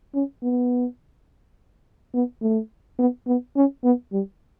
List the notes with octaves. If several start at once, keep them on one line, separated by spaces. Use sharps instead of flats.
C#4
B3
B3
A3
B3
B3
C#4
B3
G3